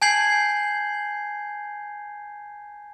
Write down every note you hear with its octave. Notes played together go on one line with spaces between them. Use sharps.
G#5 A5 G6 G#6 C7 F#7